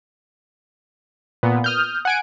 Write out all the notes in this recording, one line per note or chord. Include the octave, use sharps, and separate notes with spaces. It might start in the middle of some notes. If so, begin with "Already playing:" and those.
A#2 B3
D#6 F6 G6
F#5 G#5 D7